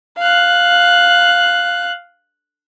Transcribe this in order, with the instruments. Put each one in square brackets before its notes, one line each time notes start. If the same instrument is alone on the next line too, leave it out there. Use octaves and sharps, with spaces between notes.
[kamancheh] F5 F#6